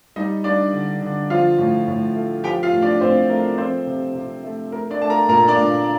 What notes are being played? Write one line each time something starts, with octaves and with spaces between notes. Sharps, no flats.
G3 D#4 D#5
G3 D4 D5
D3
D3
F3 F4 F5
A2
A2
A3
F3 G4 G5
F4 F5
A2
D4 D5
A2 C4 C5
A3 A#4
F3 C4 C5
C3
C3
A3
A3 A#4
D4 D5
A3 A5
A#4 A#5
A#2 A#4 A#5
D4 D5
A#2